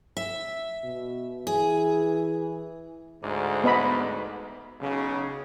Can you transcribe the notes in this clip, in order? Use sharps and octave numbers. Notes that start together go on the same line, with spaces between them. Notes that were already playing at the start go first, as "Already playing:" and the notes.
E5
B2
E3 G#4
D2 G#2
B3 D#5 B5
B1 C#3